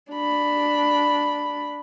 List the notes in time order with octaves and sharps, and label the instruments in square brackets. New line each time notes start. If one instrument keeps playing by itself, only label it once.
[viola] D4 B5